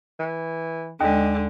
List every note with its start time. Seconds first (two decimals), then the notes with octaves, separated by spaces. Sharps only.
0.20 E3
1.01 D#2 D3 G#3 D#5